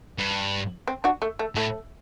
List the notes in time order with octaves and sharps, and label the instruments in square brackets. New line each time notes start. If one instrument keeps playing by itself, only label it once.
[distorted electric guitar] G2
[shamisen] C4
D4 F#4
A3
A3
[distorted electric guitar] A2 [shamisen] A3